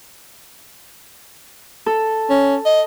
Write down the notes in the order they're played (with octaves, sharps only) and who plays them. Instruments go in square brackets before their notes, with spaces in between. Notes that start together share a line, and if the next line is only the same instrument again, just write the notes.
[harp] A4
[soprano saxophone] C#4
D#5